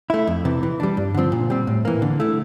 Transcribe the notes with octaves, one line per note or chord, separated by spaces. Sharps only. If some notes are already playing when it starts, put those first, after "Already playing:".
A3 E4
F2
C3 E3
E3
G3 D4
G2
D3 F3 C4
A#2
G3 C4
A2
E3 A#3
D3
A3 E4